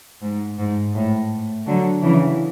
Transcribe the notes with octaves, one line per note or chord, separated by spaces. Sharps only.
G#2
G#2
A2
D3 F#3
C#3 E3